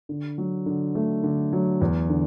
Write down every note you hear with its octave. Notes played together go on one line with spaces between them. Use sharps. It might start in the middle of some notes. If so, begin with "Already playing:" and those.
D3
F#3
D3
A3
D3
F#3
E2
D3